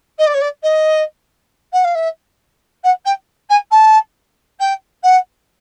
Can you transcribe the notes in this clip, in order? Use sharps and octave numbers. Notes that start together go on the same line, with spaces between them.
D#5
D5
C#5
D5
D#5
F#5
F5
E5
F#5
G5
G#5
A5
G5
F#5